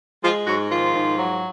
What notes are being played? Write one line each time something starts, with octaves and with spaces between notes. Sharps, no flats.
F3 G#3 F4
G#2 F#3 F#4
D#3 F3 F4
G#2
F#3